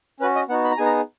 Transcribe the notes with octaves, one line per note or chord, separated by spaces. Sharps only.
C#4 F#4 B4
D#5
B3 D#4 F#4 F#5
B5
A#5
B3 D#4 G#4 G#5
A#5